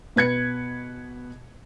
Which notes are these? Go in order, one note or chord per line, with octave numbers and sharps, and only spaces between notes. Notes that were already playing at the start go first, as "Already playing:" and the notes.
B2 B4 G#6 C#7